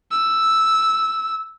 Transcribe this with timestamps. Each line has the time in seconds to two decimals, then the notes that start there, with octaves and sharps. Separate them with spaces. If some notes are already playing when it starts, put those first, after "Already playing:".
0.12 E6